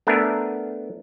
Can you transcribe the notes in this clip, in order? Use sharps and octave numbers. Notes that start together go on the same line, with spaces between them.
A3 B3 D4 A#4 E5 G#5